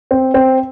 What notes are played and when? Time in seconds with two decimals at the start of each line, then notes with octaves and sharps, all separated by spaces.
0.11 C4
0.34 C4